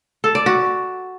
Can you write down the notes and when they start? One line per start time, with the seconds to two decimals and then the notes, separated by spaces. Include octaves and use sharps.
0.24 A4
0.35 D5
0.46 F#4